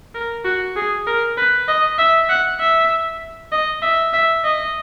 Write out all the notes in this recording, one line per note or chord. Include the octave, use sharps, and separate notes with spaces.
A#4
F#4
G#4
A#4
B4
D#5
E5
F#5
E5
D#5
E5
E5
D#5